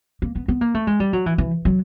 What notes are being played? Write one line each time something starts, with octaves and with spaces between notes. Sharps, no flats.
A#3
B3
B3
A#3
A3
G#3
G3
F#3
E3
E3
F#3